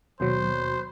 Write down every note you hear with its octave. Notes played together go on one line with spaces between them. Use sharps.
D#2 B2 F#3 C5